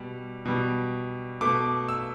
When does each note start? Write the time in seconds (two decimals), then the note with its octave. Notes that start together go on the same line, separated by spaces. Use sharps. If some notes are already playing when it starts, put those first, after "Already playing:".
Already playing: B2 G3
0.45 B2 G3
1.41 B2 A3 D6
1.88 E6